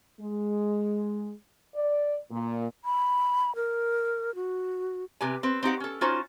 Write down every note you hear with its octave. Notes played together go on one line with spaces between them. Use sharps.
G#3
D5
A#2
B5
A#4
F#4
C3 G4 B4 G#5
C4 B4
C4 D#4 G4 F#5
C#4 A4
C#4 D#4 F4 F#4 C5